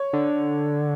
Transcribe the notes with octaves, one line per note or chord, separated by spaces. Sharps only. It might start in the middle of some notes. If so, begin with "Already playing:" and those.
Already playing: C#5
D3